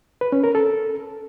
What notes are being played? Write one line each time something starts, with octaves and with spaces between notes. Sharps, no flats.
B4
C#4
A#4
A4